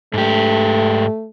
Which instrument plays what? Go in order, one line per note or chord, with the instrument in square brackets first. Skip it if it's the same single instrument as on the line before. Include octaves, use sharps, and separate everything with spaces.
[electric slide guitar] G#2 G4 [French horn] A3